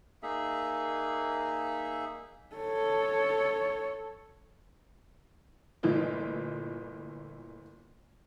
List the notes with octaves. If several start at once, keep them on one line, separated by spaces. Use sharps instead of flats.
A#3 D#4 G#4 E5
A4 C#5
G1 A#2 E3 A3 F4 D#5